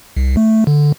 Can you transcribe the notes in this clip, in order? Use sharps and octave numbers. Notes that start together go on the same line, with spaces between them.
C2
A3
D3